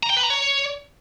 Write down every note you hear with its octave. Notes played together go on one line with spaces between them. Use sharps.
A#5
G5
B4
A#5
C#5